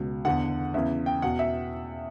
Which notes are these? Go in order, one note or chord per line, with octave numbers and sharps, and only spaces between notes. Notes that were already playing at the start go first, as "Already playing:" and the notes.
Already playing: C#2 B2
E2 D3 F#5
E2 C#3 E3 E5
G5
E2 B2 F#5
E5